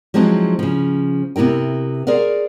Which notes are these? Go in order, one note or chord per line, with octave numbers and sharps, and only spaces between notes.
F3 F#3 G#3 C4 D#4 E4
C#3 F3
C3 B3 E4 A#4 G5
G#4 A#4 C5 D5 F5